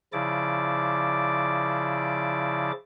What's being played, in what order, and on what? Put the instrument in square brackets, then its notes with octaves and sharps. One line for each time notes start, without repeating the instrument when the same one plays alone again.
[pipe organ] C#3 F3 E4 D5 D6